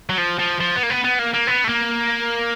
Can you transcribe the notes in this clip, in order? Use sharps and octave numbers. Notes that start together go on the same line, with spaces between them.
F#3
F3
F3
F3
B3
A#3
B3
B3
A#3
A#3
B3
A3
A#3